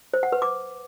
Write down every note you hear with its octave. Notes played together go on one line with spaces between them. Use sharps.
C5
F#5
B4
D6